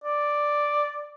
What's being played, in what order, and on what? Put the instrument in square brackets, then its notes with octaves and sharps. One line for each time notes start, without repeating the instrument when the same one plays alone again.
[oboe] D5